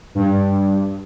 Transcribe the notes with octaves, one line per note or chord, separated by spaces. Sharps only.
G2